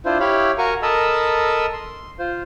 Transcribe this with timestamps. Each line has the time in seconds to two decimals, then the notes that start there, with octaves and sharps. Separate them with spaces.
0.05 D4 E4 F4 C5
0.20 E4 G4 C#5 F5 B5
0.58 F#4 A#4 F5 G#5 A#5 C#6
0.82 A4 A#4 D#5 A5 B5 E6
1.73 C6
2.19 F4 C5